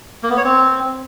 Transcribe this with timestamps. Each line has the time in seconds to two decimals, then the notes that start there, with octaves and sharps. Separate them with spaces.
0.23 A#3
0.30 B3
0.37 C#5
0.44 C4